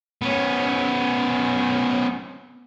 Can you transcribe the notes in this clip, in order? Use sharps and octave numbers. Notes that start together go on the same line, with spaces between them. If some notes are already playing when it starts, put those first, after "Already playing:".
B3 C#4